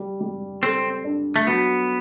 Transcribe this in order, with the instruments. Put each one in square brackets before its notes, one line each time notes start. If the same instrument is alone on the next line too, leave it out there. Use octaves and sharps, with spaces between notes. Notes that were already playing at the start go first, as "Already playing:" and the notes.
Already playing: [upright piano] G3
G3
[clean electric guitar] C4 [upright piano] A4
[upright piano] D4
[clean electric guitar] A3
[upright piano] F#3 [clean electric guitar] B3